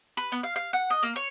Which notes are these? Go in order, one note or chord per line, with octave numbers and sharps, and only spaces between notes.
B4
B3
F5
F5
F#5
D#5
A#3
C#5